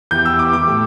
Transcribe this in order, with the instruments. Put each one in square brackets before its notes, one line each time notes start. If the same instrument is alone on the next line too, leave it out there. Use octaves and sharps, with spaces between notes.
[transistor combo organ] E2 E3 B3 G4 [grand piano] G6
[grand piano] E6
D6
D6
[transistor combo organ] A2 A3 G4